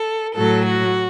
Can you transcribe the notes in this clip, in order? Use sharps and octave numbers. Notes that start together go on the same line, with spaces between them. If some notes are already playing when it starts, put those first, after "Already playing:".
Already playing: A4
A2 F#3 A4
F#4